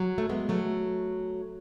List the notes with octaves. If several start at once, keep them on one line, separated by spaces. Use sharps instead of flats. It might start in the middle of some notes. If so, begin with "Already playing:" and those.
Already playing: F#3
A3
G#3 B3
F#3 A3